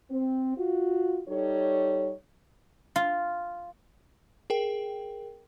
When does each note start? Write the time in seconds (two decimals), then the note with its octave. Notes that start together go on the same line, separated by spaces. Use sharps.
0.11 C4
0.57 F4 F#4
1.28 G3 D#4 A4 C#5
2.96 F4
4.50 G#4 A#4 G5